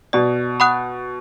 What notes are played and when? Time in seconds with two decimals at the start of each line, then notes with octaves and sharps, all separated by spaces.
0.13 B2 D5
0.60 F#5 B5 D#6 F#6